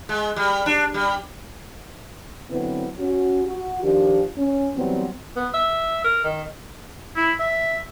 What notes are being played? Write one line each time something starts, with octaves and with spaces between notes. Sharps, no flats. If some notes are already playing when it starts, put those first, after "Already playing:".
G#3
G3
D4
G3
D3 F#3 B3 C4 E4 B4
C#4 F#4
F#4
D#3 F3 D4 G4
C#4
E3 F#3 G3 B3 C4
B3
E5
A#4
D#3
E4
E5